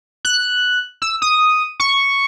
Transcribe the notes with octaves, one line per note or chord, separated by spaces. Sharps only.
F#6
E6
D#6
C#6